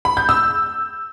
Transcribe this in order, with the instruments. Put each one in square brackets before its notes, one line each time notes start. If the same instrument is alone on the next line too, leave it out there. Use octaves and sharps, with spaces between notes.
[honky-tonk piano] B5
G6
E6